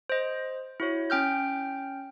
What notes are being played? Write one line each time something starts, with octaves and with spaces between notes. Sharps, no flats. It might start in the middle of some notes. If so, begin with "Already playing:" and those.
C5 D#5
E4 F#4 C#5
C#4 G5 F6 G6